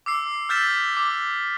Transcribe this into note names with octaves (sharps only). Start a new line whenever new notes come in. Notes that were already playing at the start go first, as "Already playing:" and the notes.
D6 E6 C7
E6 F6 G6 A6 B6 E7
D6